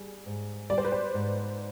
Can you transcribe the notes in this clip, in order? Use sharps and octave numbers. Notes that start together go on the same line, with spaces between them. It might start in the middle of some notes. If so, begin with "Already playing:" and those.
Already playing: G3 G#4
G#2
G3 D5
C5
B4
C5
G#2